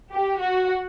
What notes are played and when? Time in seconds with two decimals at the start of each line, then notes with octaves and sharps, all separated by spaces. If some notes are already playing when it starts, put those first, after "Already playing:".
0.12 G4
0.40 F#4